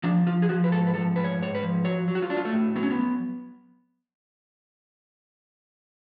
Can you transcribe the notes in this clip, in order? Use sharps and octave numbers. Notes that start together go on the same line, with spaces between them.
F3 D4
F3 F4
G#4
F3 F#4
B4
G#2 A4
B4
F3 A4
G#2 B4
C#5
G#2 C#5
B4
F3
F#3 C#5
F#3
F#4
F4
F#3 D4
F4
A3
A2
F#3 B3
C#4
B3
F#3